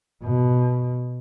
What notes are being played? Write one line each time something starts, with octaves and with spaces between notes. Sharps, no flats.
B2